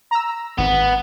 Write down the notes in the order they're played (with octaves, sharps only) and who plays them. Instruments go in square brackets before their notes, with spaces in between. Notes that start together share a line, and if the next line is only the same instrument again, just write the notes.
[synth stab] A#5 E6
[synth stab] G#1 [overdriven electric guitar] B3